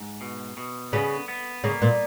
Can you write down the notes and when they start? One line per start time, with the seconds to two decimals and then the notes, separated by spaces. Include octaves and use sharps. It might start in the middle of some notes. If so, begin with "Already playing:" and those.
Already playing: G#2
0.21 B2
0.57 B2
0.93 C#3 B3
1.28 B3
1.64 C#3 A#3
1.82 A#2